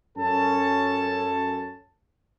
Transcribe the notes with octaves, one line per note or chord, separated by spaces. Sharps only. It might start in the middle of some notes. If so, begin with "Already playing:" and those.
F#2 C#4 A4 A5